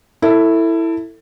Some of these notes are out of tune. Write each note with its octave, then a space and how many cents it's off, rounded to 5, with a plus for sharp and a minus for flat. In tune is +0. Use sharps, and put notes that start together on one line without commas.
E4 +0 A4 +25